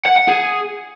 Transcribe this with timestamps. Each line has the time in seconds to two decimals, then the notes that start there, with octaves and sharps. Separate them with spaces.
0.05 F#5
0.16 F#5
0.28 G#4